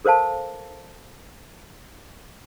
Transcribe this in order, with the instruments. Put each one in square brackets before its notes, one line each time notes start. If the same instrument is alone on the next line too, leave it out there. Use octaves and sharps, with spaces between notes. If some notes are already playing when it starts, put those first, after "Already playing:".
[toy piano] A4 A#4 C5 F5 A5